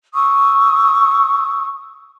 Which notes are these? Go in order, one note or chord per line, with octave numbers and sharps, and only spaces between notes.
C#6 D#6 E6